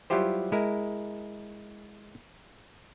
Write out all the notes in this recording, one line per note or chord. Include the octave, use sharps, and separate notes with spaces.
F#3 G3 E4 F4 G4 C5
G#3 E4 A#4